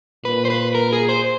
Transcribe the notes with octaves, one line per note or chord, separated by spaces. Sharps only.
A#2 B4
C5
B4
A#4
G#4
C5